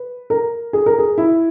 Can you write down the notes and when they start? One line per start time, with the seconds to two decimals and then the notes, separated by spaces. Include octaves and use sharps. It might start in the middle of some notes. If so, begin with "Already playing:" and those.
Already playing: B4
0.30 A#4
0.73 G#4
0.86 A#4
0.98 G#4
1.18 E4